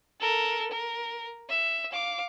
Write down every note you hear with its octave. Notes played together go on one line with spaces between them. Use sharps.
A4 A#4
A#4
E5
F5 D6